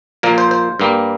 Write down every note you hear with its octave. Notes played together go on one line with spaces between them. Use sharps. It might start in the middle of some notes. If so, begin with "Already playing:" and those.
A#2 F3 A#3 A#4
C5
C5
G2 G3 A#3